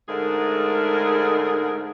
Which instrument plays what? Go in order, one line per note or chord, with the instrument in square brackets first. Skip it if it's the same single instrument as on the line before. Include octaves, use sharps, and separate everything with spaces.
[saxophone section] G#2 D3 G#3 A3 G#4 A#4